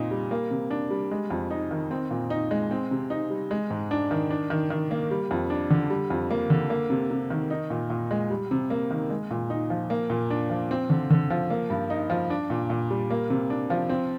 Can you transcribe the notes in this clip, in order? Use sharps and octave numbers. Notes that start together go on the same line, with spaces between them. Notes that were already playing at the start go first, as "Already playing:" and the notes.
Already playing: A#2 C4 D#4
G3
A#3
C3
D4
G3
G#3
F2
D#4
D#3
C4
A#2
D#4
G#3
C4
C3
D#4
G3
G#3
G#2
D4
D#3
D4
D#3
D#3
A#3
G3
F2
D4
D3
G3
F2
A#3
D3
A#3
C3
C3
D#3
D#4
A#2
A#2
G#3
G3
C3
A#3
D#3
G#3
A#2
D#4
F3
A#3
A#2
D4
F3
C4
D3
D3
F3
A#3
G2
D#4
F3
D4
A#2
A#2
G3
A#3
C3
D4
F3
C4